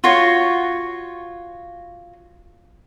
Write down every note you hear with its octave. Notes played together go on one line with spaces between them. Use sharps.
F4 F#4 C#5